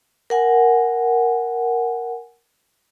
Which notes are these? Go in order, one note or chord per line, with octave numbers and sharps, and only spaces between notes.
A#4 F#5 G#5